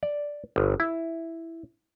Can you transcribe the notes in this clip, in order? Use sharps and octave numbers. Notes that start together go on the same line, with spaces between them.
D5
G1
E4